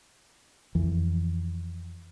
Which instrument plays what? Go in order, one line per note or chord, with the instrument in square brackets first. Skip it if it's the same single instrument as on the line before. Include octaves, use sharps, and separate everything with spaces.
[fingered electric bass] F2 E3